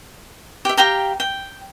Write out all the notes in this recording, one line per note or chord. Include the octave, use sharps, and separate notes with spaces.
G4 E5
G4 F5 G5 A#5
G5